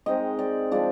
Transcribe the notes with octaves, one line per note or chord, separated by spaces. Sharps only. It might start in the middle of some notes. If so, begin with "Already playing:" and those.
D#3 G#3 C4 D#5
D5
F3 G#3 D4 D5